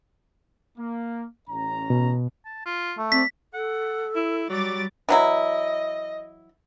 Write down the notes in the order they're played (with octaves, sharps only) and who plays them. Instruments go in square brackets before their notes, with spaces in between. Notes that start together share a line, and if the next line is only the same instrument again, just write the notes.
[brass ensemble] A#3
A1 C#4 A#5
[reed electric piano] B2
[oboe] A5
F4
[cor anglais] A3
[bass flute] C4 [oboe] D5 [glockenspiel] B6
[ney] A4 [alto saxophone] F#5
[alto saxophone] E4
[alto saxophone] F#3 [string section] G3 D6 A6
[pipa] E3 F#3 E4 [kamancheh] D#5